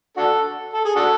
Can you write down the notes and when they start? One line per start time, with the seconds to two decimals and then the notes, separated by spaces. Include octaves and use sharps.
0.17 D4 F#4 A4
0.74 A4
0.85 G#4
0.96 D4 F#4 A4